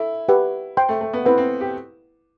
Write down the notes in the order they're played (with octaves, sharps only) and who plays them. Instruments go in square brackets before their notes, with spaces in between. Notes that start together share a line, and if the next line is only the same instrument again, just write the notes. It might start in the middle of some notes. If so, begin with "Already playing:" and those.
Already playing: [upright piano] E4 [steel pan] A4
[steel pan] G4 B4 F#5
C5 G5 C6
[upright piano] A3
A3
B3
[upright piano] C4 [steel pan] E4 B4 F#5
[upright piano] C4
G4